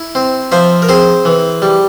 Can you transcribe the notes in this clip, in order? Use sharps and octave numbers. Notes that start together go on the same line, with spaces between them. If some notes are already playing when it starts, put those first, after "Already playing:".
Already playing: E4
C4
F3 C5 E5
A#4
C4 G#4 C5
E3
G3